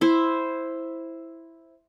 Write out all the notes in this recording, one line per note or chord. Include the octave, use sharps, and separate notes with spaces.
E4 C5